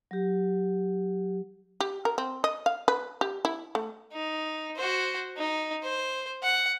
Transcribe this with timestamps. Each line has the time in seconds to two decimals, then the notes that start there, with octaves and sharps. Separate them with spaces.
0.11 F#3 G4
1.80 G4
2.05 A#4
2.18 C4
2.44 D#5
2.66 F5
2.88 B4
3.21 G4
3.45 E4
3.75 A3
4.13 D#4
4.76 F#4 C5
5.37 D#4
5.83 C5
6.43 F#5